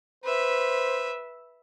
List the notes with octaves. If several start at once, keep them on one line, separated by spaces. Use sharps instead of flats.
B4 C5 E5